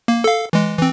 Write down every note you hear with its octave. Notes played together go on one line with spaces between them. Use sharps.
A#3
A4 F5
E3 G#3
E3 C4